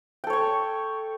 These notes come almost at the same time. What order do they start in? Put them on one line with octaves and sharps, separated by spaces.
G5 A4 C#5 C#6